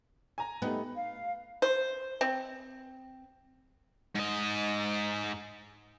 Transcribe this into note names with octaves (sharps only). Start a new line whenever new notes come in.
G#5 A#5
A3 B3 D#4 G4
F5
C5
C4
G#2 D#5